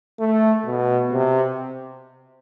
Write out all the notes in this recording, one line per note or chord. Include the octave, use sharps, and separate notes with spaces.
A3
B2
C3